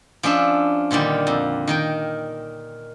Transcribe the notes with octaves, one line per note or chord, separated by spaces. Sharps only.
F3 C#4 D4 E5
A#2 D3 D#3 G3
F2
D#3 A#4 G5